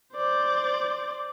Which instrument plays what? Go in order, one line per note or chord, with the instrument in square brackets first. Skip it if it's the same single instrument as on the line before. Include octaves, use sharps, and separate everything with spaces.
[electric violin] C5 D5